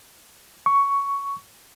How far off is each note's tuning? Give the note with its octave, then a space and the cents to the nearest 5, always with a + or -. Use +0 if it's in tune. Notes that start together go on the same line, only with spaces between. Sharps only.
C#6 +10